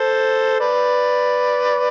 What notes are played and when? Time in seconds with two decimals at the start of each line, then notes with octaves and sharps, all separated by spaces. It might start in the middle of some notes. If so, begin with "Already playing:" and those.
Already playing: A4 C5
0.60 B4 D5